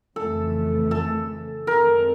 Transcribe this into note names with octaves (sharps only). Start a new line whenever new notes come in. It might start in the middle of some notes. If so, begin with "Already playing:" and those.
F2 C#3 E3 A3 A4
A4
F#2 D#3 G#3 C4 A#4